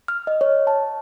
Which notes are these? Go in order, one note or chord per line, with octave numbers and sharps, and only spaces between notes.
F6
D#5
C#5
A5